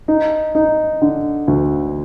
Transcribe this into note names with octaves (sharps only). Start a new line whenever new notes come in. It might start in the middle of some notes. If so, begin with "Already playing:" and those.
D#4
D#4
D3
D2